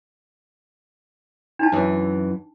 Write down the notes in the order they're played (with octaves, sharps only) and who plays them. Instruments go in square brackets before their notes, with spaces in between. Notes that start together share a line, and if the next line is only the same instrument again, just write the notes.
[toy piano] D4 D#4 A5
[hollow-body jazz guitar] F#2 E3